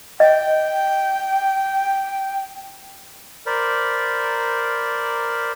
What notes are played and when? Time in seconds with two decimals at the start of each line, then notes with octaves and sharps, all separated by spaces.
0.20 D#5 G5
3.46 A#4 C5 D5 B5